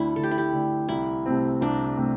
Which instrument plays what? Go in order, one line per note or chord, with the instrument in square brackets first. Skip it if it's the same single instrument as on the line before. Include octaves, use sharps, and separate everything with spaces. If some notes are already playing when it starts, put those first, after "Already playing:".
Already playing: [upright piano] D2 D3 A3 [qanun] C4 D4 E4
[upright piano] D2 [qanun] A4
[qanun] G4
E4
G4
[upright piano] D3 A3
[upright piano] C2 [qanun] E4
[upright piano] C3 A3 C4
[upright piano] C2 [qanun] D4
[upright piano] C3 A3 C4